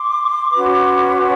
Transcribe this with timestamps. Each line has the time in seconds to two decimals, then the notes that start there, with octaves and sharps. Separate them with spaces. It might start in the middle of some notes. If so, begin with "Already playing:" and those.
Already playing: C6 D6
0.52 C#4 F#4 B4